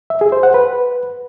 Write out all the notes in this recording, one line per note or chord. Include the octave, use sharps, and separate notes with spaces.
E5
G#4
C5
F#5
B4